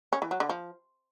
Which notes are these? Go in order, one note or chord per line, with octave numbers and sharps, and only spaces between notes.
C#4
E3
F#3
D3
F3